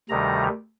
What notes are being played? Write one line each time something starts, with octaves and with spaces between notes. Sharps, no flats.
D2 C3 D#3 G3 A#5